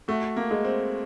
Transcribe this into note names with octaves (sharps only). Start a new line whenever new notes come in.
A3 F#4
A#3
G#3
C4